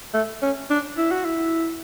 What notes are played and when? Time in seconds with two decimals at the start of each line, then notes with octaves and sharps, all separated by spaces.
0.14 A3
0.42 C#4
0.70 D4
0.97 E4
1.11 F#4
1.25 E4